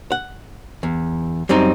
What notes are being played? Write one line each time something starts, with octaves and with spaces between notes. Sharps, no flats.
F#5
E2
F#2 G3 C4 D#4